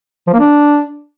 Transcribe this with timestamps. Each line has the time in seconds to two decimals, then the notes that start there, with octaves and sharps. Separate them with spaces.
0.27 F3
0.33 A#3
0.39 D4